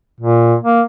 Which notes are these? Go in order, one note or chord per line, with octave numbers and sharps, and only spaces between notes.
A#2
A#3